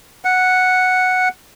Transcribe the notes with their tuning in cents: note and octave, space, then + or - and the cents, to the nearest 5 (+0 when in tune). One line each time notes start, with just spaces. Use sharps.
F#5 -5